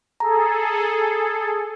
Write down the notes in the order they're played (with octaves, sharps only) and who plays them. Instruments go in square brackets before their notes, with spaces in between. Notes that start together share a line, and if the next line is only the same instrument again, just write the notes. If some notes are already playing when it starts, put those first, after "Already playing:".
[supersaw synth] G#4 A4 [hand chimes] A#5